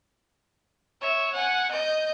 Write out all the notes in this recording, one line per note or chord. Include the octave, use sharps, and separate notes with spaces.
C#5 E5
F#5 G#5
D#5 G6